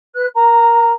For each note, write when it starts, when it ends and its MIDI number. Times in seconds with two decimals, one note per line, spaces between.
0.15 0.27 71
0.15 0.27 90
0.35 0.92 70
0.35 0.92 82